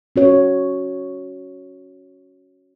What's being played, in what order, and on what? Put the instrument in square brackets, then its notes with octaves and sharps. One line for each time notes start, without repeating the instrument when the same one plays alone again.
[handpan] C#4 F#4 C#5